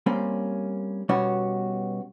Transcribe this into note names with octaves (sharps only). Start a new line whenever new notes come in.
G3 A#3 C4 C#4
B2 G3 B3 C#4 F#4 C#5